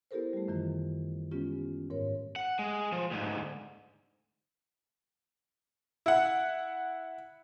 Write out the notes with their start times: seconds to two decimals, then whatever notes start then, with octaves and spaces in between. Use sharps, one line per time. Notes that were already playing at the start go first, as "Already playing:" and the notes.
0.11 B3 E4 G4 A4 A#4 C5
0.33 G3 A3
0.48 F#2 D#3 E3 F4
1.31 G#3 B3 C#4 F4 G4
1.90 G#2 A#4 C#5
2.36 F#5
2.59 G#3
2.92 F3
3.11 D2 G#2
6.06 E4 F#5